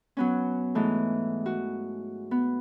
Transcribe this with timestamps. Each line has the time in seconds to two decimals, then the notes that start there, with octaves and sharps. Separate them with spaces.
0.17 F#3 B3 C#4
0.75 G#2 E3 A3
1.46 F#4
2.31 B3